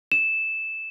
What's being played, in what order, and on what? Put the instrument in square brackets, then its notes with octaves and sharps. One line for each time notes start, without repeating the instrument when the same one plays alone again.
[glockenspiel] E7